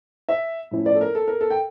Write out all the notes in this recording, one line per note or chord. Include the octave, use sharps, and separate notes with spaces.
E5
A2 F3 C#4 E4
D5
A4
A#4
A4
A#4
A4
G5